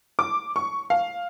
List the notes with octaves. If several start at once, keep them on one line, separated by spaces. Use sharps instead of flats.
D6
C#6
F5